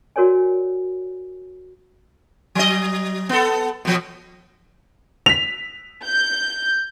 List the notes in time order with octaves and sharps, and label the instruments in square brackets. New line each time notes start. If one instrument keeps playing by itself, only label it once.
[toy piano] F#4 A#4 C#5 D5 G#5
[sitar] F#3 D#5
B3 A4
B2 F3
[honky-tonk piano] B6 F7
[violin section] G6